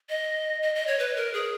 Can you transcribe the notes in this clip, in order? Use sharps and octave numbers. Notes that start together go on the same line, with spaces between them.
D#5
D#5
D#5
C#5
B4
A#4
G#4